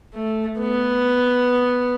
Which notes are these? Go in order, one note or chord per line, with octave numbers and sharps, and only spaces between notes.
A3
B3